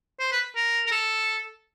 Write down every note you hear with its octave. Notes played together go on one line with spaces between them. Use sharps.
C5
B4
A#4
A#4
A4